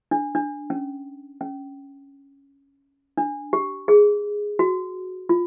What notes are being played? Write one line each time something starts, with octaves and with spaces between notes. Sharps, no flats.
D4
D4
C#4
C#4
D4
G4
G#4
F#4
F4